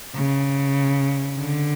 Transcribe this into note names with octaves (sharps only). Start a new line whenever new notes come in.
C#3
D3